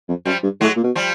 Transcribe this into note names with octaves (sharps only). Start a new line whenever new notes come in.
F2
F#2 F3 G3
G2
A2 F#3 G#3
A#2
B2
F3 G3